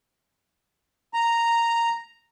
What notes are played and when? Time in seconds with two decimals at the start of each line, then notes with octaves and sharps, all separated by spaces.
1.14 A#5